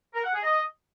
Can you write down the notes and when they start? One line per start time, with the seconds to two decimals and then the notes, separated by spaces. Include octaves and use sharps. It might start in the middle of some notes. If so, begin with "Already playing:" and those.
0.14 A#4
0.24 F#5
0.33 G#4
0.43 D#5